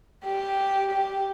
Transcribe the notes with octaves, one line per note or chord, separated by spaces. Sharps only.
G4
G4